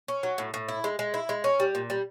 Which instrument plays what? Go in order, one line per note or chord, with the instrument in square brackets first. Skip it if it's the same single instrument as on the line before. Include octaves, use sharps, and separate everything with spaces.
[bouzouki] C#4
F#3
A2
A2
E4
G#3
G#3
E4
G#3
C#4
G3
A#2
G3